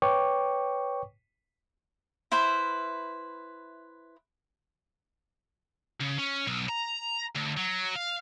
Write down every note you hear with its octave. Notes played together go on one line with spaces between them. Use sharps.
B4 C#5 G5 C#6 D6
E4 B4 C5 E5
C#3
C#4
B1
A#5
D2
F#3
F5